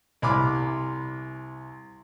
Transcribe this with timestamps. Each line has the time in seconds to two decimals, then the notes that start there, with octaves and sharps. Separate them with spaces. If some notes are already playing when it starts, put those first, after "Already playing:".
0.22 C2 G#5 B5 C6 D6 F6